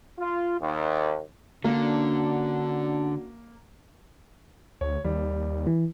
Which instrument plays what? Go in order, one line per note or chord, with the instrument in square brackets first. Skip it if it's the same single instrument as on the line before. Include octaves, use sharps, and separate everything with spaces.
[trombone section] F4
D#2
[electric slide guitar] D3 [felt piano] A#3 [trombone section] C#4 D4 F#4
[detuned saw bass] D2 [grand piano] C#5
[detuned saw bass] D#2 [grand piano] G3
[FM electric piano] E3